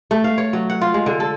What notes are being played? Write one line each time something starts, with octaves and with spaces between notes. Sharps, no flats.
A3
F5
C#5
F#3
F#5
F4
G#3
D3
A4